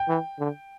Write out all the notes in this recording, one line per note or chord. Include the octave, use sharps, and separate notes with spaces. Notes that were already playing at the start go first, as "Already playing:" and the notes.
Already playing: G5
E3
D3